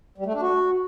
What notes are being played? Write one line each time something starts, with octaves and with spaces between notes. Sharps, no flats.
G3
A3
D4
F#4